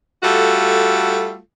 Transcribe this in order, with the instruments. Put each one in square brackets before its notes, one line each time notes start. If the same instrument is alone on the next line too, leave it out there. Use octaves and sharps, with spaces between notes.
[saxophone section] G3 A3 F4 F#4 A4